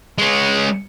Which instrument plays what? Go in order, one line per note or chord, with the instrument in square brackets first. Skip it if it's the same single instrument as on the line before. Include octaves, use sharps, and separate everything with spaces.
[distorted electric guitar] G#3 C#4